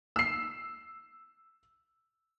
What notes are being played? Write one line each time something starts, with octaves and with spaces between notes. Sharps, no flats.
E6 C7